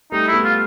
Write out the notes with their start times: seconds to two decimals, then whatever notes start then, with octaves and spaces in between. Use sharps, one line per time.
0.12 G3 A3 D#4
0.28 E4
0.33 A3 B3
0.45 F4